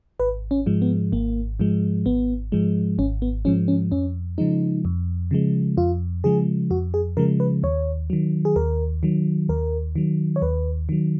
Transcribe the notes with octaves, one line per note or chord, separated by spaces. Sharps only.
G#1 B4
C#4
G#2 F3 G#3
B3
G#1 A#3
G#2 F3 G#3
G#1 B3
G#2 F3 G#3
G#1 C#4
B3
G#2 F3 G#3 C#4
C#4
F2 C#4
C#3 F3 G#3 D#4
F2
C#3 F3 G#3
F2 F4
C#3 F3 G#3 G#4
F2 F#4
G#4
C#3 F3 G#3 A#4
B4
D#2 C#5
D#3 F#3
G#4
D#2 A#4
D#3 F#3
D#2 A#4
D#3 F#3
C#5
D#2 B4
D#3 F#3